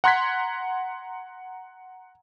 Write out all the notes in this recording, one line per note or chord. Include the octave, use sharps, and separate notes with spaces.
F#5 A#5 C6 F#6 G#6 B6